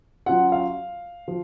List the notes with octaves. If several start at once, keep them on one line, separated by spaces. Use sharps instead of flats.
F#3 C#4 F4 F#5
F5
F3